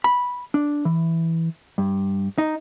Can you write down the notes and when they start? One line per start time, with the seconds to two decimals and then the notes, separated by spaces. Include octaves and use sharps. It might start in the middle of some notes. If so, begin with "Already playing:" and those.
0.04 B5
0.54 D4
0.85 E3
1.78 G2
2.38 D#4